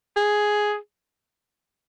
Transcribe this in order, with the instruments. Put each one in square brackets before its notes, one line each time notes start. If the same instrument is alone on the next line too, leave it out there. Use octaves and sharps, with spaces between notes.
[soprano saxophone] G#4